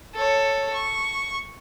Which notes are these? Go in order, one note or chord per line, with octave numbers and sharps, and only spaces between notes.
A4 C#5
C#6